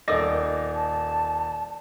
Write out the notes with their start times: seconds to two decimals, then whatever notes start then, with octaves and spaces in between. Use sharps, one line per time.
0.08 D#1 D#4 A4 A#4 D5 D#5 A#6
0.75 A5